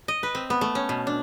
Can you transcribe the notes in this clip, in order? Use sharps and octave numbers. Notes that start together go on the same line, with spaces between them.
D#5
B4
C4
B3
A3
C#4
B2
D4